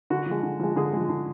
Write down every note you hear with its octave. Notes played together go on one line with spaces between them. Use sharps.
D3 F#4
F3 G#3
D3
F3 G#3
D3 G#4
F3 G#3
D3